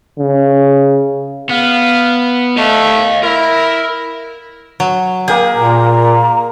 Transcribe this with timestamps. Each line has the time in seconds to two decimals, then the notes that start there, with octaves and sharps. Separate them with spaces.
0.19 C#3
1.50 B3 F5
2.58 A3 D#5 F5
3.23 E4 A#4
4.80 F#3
5.28 A#3 G#4 A#4 G5
5.56 A#2 A#5